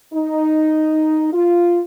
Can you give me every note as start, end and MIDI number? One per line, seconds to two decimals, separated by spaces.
0.13 1.31 63
1.33 1.81 65